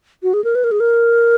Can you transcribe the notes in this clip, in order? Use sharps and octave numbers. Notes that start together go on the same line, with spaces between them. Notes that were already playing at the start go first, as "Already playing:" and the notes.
F#4
G#4
A#4
B4
A#4
G#4
A#4